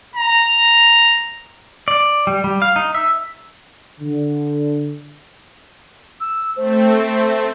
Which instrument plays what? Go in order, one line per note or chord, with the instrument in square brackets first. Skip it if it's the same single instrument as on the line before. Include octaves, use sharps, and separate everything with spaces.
[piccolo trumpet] A#5
[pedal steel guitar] D5
G3
G3
F5
D#4
E5
[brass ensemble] D3
[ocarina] E6
[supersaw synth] A3 C4 [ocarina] C5